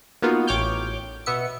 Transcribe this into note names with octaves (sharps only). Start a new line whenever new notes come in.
A#3 B3 D#4 F4 F#4
A1 C#5 G5 D6 F6 G6
B2 B3 E5 C#7